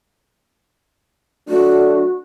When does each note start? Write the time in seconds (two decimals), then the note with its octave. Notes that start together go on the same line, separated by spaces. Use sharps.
1.49 F#3 A3 D4 F#4